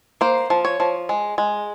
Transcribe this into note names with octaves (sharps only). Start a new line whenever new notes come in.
A#3 C5
F3
C#5
F3
G#3
G#3